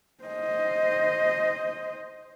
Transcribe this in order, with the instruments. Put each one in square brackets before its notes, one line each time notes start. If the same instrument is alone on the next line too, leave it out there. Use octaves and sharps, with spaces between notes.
[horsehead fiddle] C5 D#5